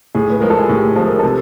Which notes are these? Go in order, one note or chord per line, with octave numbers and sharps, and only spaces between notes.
A2 G#4
B4
F3 G#3 A#4
A4
G#4
A2 G4
F3 G#3 A4
A#4
C3 A4